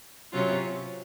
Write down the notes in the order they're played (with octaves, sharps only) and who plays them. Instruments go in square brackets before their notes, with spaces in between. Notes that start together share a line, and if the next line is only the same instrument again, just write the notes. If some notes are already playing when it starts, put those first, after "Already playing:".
[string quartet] C3 F#3 C#4 F4